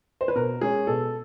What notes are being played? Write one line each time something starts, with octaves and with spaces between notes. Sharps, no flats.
C5
B4
B2 A#4
G#3 C#4 G#4
B2 A4